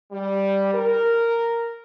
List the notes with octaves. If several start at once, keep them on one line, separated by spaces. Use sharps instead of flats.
G3
A#4